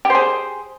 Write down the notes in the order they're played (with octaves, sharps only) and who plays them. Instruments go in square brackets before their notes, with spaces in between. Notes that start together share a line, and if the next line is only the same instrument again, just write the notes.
[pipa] G4
C5
G#4